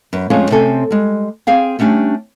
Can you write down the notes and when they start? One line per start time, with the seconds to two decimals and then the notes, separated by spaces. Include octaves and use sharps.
0.13 F#2 B4
0.30 F2 G#3 A3 C#4 F4
0.50 C3 C4 C#4 A4 G#5
0.91 G3 G#3
1.47 C4 G#4 F5 G5
1.79 G3 A3 C#4 D4 G4